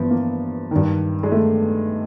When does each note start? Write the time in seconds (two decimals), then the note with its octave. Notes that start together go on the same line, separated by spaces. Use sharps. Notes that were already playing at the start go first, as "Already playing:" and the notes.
Already playing: G2 E3 F3 B3
0.11 A#3
0.71 G2 D#3
1.23 G#3
1.32 A3